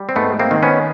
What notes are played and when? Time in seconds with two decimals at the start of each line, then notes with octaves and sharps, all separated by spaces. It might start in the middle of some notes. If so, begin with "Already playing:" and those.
Already playing: G3
0.09 C4
0.16 G#2 A3 B3
0.39 A#3 C4
0.51 D#3
0.63 B3 C#4